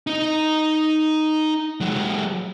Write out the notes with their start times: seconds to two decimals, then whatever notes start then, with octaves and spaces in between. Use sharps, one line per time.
0.07 D#4 D#5
1.80 F#3 G#3